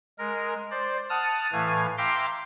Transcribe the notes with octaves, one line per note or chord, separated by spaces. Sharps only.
G#3 A#4
C5 D5
F#5 A5 D#6 F6
A2 E3 A3 F5 G#5
E5 F5 G5 A#5 C6 D6